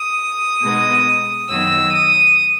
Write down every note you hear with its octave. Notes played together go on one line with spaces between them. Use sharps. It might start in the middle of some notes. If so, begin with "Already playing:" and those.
Already playing: D#6
B2 G#3 B3 D#4
F#2 D#3 F#3 B3 D#4 E6
D#6